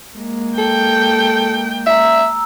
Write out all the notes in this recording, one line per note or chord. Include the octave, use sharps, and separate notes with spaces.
G#3 A#3
A4 G5
E5 A#5 E6